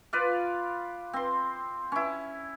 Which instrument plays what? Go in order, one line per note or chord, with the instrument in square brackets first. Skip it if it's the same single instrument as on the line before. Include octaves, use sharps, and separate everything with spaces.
[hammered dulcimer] F4 B4 D5 F5
C4 C6
C#4 E4